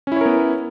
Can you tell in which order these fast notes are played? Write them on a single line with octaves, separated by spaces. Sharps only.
C#4 E4 C#5 A#4 B3